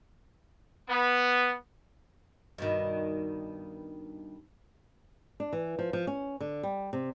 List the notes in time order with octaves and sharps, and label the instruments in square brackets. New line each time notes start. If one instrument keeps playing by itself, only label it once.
[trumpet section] B3
[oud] G2 B2 D#3
[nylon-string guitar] D4
E3
F3
F3
C#4
D3
G3
C3